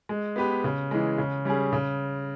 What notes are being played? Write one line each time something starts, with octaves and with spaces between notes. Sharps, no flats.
G#3
B3 G4 B4
C#3
E3 G#3
C#3
G3 C#4 G#4
C#3